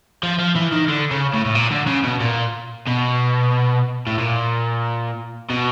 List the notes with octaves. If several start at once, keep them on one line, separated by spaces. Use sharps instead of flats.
F3
F3
E3
D#3
D3
C#3
A2
A2
A#2
D3
C#3
B2
A#2
B2
A2
A#2
B2